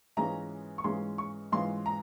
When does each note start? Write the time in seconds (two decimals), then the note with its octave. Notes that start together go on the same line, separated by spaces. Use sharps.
0.17 G#2 E3 G#3 C#4 F4 A#5
0.78 C#6
0.84 G#2 E3 G#3 C#4 F4 C6
1.18 C#6
1.52 G#2 E3 G#3 C#4 F4 C6
1.86 A#5